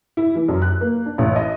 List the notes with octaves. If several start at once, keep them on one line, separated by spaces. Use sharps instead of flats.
E4
E3
F#2
F#6
A#3
D4
A1
D#5